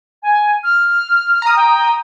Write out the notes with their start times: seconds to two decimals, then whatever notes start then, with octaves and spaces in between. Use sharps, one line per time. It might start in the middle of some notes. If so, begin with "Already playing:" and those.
0.22 G#5
0.63 F6
1.42 A#5 D#6
1.56 G5